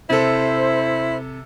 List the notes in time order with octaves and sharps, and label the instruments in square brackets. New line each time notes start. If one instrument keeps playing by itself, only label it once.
[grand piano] C3 A4 [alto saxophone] E4 [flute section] C5